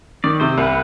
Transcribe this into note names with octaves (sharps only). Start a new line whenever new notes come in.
D#3 D5
C3 C5
C2 B4